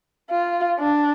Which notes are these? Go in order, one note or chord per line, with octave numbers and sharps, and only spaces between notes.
F4
D4